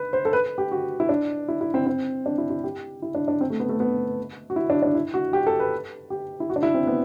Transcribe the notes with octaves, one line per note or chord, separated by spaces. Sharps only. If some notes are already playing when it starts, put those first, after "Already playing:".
Already playing: B4
C5
A4
B4
G4
F#4
E4
D4
E4
E4
C4
C4
D4
E4
E4
G4
E4
D4
D4
C4
A3
B3
A3
B3
F#4
E4
D4
D4
E4
F#4
G4
A4
B4
G4
E4
F#4
D4
E4
C4
B3